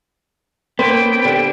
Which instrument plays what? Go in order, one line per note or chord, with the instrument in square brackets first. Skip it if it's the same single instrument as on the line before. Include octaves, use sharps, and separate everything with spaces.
[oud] A#3 C#4 C5 [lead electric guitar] B3 [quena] G5
[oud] D3 G3